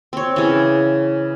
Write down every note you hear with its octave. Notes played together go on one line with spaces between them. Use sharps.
C4 C#5
C#3 E3